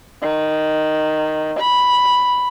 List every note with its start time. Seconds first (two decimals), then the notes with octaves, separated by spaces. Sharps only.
0.22 D#3
1.60 B5